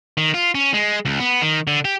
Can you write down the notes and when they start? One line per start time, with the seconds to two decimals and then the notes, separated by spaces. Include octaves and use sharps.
0.17 D#3
0.34 F4
0.55 C#4
0.74 G#3
1.05 C#2
1.20 B3
1.42 D#3
1.67 D3
1.85 G4